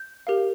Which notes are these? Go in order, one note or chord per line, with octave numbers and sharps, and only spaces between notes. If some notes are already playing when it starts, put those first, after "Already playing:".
Already playing: G6
G4 A#4 F5